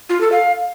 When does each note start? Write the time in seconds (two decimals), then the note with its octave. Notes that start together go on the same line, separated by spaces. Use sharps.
0.09 F4
0.21 A4
0.32 F5